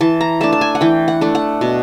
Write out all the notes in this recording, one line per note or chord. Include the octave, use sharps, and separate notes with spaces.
E3 A5
A#5
A3 D4 A5
A5
G#5
F#5
E3 G5
F#5
A3 D4
F#5
B2